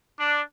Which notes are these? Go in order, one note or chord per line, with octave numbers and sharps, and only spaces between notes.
D4